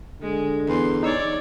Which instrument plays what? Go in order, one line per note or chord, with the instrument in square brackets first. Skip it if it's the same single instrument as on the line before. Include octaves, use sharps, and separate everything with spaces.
[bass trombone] D3 [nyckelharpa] G#3
[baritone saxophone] E2 [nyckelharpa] C6
[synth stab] D#4 E6 [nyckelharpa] C#5 D5